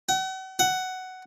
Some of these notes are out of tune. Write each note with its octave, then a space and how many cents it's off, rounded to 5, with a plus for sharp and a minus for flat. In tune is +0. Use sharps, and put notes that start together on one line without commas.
F#5 +40
F#5 +10